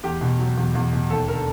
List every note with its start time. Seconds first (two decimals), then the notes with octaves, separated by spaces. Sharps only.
0.03 E2 G4
0.21 B2
0.39 F#3
0.57 E2
0.75 E2
0.93 B2
1.10 D#2 A4
1.28 D3 A#4